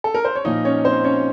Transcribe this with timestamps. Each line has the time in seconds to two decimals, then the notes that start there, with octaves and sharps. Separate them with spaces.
0.04 A4
0.14 A#4
0.25 C5
0.35 C#5
0.45 A#2 F3 A#3 D#4 D#5
0.65 C#4 C#5
0.85 C4 C5
1.04 C#4 C#5